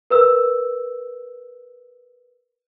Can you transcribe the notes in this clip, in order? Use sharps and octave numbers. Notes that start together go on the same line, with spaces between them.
A#4 B4 E6